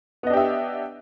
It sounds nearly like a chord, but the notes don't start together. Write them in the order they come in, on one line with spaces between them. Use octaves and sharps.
B3 D#5 D4 G4 E5